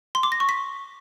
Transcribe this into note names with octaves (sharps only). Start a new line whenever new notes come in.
C6
D6
A#6
C#6
B6